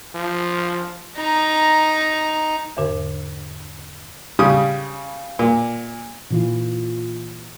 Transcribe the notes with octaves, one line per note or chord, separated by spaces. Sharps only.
F3
D#4 A#5
E2 G#2 D3 A#4
C#3 G3 D#6
A#2
A#2 E3 F4